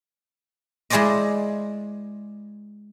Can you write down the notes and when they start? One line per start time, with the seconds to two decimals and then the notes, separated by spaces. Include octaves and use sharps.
0.90 G#3 E4 G#4 C5 D5 D#5